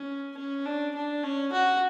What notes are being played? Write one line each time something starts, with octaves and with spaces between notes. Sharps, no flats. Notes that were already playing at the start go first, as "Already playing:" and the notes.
Already playing: C#4
C#4
D4
D4
C#4
F#4